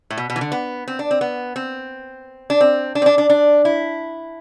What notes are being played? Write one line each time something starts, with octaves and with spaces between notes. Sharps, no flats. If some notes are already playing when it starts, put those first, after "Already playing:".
A2
B2
B2
E3
D3
B3
C4
D4
C4
B3
C4
D4
C4
D4
C4
D4
D4
D4
E4